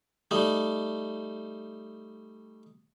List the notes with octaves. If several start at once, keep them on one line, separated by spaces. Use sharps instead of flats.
G3 A3 D#4